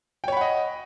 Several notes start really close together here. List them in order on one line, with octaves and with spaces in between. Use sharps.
G5 C#5 B5 F#5 D#5